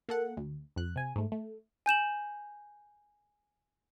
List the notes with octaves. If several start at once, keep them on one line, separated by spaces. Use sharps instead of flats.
A#3 A4 F#5
D2
F2 F#6
C3 G#5
G#2 A3
A3
G#5 G6 E7 F#7